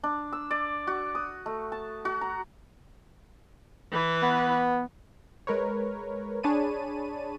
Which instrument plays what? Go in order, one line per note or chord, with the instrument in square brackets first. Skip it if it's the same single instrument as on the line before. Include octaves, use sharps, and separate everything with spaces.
[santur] D4
E6
D5
F#4
D#6
A3
A5
F#4
A#5
[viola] E3 B4
[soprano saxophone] B3
[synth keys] G#3 A#4 B4 C#5
D4 G#4 C#5 A5 B5 D#7